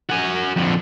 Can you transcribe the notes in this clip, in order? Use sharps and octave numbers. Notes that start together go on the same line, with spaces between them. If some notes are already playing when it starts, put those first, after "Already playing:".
F#4 G#5
F2 D3